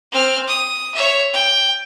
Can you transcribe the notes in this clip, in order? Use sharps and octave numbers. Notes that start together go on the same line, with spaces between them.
C4 F6
D#6
C#5 E5
G5